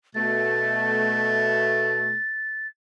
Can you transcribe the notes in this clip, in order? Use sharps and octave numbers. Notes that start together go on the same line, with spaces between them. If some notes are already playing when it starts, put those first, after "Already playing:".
B2 A3 A6